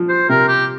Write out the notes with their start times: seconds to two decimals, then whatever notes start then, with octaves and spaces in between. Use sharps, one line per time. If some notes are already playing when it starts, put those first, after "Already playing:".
Already playing: F3
0.09 C5
0.29 C3 A#4
0.48 G4